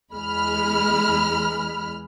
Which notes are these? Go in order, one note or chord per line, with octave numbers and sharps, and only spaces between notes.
E2 G#3 B5 F6